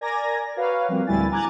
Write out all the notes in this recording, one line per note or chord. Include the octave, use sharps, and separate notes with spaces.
A#4 D5 G#5 A#5 G#6 A#6
F#4 B4 C#5 F5
F3 G3 A#3 C4
D2 A2 G3 E4 G#5 A6
G#5 A#5 D6 F#6 G#6 A6